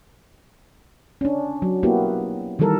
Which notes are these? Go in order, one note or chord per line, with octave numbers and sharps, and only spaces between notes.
C#4 D4
F#3
A#3 B3 E4 F#4 G4
D#3 E3 G3 A4 A#4